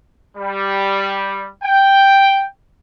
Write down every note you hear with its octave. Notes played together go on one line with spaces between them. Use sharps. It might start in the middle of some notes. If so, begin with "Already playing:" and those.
G3
G5